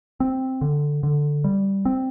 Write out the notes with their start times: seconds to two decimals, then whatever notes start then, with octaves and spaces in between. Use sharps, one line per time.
0.20 C4
0.61 D3
1.03 D3
1.44 G3
1.85 C4